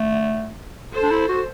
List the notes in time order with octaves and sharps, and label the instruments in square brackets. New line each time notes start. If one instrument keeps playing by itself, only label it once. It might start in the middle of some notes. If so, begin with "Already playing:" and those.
Already playing: [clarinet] A3
[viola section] A4 C5
[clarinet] D4
E4
F#4